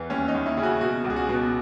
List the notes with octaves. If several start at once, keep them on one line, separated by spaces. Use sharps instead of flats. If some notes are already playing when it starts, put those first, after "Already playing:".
Already playing: E2 E3
D#2 C#4
D#4
D#2
E4
C#3 G#4
F#4
B2 F#4
C#2
G#4
F#4
B2